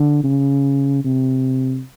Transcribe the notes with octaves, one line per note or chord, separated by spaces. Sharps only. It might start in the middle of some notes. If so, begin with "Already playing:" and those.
Already playing: D3
C#3
C3